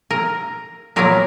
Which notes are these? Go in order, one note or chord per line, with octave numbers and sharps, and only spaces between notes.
A#4
A#2 F#3 B3 A#4